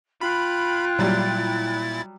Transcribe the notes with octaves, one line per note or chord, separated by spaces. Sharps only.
F4 G5 B5 F#6
A#2 F#3 G3 E4 A6